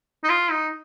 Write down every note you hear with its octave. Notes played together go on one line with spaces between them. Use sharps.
D#4
F4
D#4